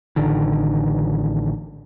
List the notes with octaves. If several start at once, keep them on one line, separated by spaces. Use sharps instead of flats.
A1 D3 D#3